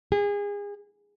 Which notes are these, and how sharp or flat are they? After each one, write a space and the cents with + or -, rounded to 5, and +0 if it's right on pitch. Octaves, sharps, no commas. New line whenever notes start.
G#4 -30